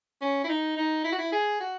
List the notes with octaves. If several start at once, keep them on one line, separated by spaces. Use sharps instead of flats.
C#4
E4
D#4
D#4
E4
F#4
E4
G#4
F#4